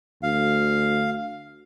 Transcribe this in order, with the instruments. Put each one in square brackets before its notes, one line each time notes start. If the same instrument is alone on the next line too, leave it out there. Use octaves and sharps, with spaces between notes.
[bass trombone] D2 [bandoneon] F5